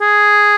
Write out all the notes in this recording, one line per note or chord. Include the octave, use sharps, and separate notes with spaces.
G#4